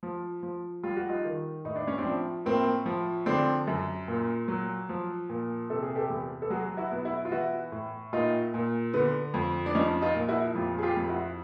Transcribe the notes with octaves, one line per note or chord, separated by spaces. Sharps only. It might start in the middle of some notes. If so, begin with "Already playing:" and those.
F3
F3
G3 F4
F#4
D#4 F4
D#3
A2 D#4
D4
C#4
C4 D4
F3
A2 A#3 C4
F3
D3 C4 D4
F#2
A#2
F#3
F3
A#2
C3 A4
G#4
G4 A4
E2
A4
F#3 F#4 G#4
E4 F#4
B2
E4 F#4
F4
E3 E4 F#4
A2
A#2 D#4 F4
A#2
D3 B3
F2
D4
F3 C#4 D#4
D#4 F4
A#2
E4 F#4
F2 F4 G4
G#4
F4 G4
F2
E4 F#4